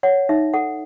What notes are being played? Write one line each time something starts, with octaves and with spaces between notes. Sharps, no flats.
C#5 F#5
D#4 E5
A4 F#5